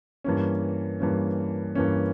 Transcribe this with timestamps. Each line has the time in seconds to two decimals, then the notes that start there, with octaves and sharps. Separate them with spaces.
0.24 G2 E3 A#3 C#4
1.00 G2 E3 A#3 C#4
1.75 G2 E3 A#3 C#4